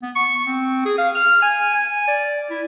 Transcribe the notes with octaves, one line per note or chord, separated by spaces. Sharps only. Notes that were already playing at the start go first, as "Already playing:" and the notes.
B3
C#6
C4
G#4
F5
F6
G#5
G#5
D5
E4